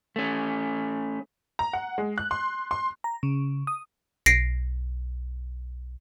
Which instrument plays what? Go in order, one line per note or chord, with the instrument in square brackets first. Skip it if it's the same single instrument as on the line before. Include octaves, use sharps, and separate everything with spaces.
[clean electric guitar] A3 C#4
[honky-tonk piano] A#5
F#5
G#3
F#6
C6
C6
[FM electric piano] A#5
C#3
D#6
[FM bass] B1 [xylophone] A#6 C7 D7